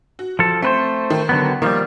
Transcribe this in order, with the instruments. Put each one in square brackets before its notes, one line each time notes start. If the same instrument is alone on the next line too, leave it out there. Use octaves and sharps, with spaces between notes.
[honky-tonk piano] F#4
[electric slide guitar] F3 A4
[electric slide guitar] A3 B4 C5 [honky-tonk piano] C4
[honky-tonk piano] D#3
[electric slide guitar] D3 F#3 B3
[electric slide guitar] D#3 F3 G3 [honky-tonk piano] A#3